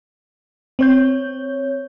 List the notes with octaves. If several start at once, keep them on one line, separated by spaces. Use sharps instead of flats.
C4 C#5 G6